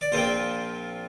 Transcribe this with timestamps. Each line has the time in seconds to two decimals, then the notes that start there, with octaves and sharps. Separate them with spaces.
0.01 D5
0.12 A#1 A#2 F3 C4 C5